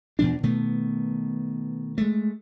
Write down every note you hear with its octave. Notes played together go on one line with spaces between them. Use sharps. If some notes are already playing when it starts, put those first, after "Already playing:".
E2 B2 F3 D4
B2 D#3 A3 B3
G#3 A3